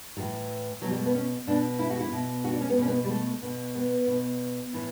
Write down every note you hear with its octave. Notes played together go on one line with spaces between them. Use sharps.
A2 E3 F#3
B2 F#3
G3
A3
B3
C#4
B2 D4
E4
F#4
E4
B2
F#4
D4
C#4
B3
B2 C#4
B3
G3
A3
B2
B3
B2
A2 E3